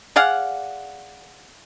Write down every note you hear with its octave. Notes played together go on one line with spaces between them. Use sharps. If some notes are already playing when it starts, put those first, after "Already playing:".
G#4 D5 F5 F#5